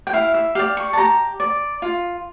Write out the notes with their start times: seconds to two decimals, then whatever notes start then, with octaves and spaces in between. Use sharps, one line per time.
0.07 G5
0.13 E4 F5
0.34 E5
0.55 G4 D5 F5
0.77 C#6
0.93 A5
0.98 G4 A#5
1.40 D5
1.82 F4